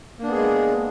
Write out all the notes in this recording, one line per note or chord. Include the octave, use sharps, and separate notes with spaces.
G#3 A#3 B3 D4 G#4